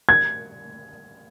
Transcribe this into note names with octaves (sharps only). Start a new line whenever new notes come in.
G#6